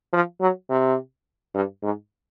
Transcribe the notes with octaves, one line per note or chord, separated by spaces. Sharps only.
F3
F#3
C3
G2
G#2